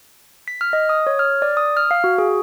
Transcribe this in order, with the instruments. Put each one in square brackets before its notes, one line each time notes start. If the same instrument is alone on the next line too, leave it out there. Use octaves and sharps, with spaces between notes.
[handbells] B6
F6
D#5
D#6
C#5
F6
D5
D#6
F6
F5
F#4
G#4